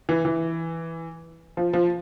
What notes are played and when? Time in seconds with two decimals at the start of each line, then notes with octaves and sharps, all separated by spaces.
0.09 E3
0.25 E3
1.57 F3
1.73 F3